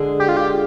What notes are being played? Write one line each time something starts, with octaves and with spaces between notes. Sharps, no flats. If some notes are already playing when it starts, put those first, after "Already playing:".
Already playing: D3 G#3 D4 G#4
G4
F4
G4